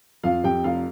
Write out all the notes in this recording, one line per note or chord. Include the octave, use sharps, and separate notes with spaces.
F2 F4 F5
F2 G4 G5
F1 F4 F5